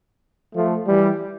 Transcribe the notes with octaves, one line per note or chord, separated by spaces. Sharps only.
F3 A3
E3 G3